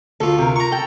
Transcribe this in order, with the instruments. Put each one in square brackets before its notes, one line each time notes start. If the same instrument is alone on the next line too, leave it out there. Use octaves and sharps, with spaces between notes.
[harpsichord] D2 F4 [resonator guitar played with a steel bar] A4
[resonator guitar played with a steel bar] C3 A#4
[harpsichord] A#5 C#6
[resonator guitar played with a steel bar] A4 G5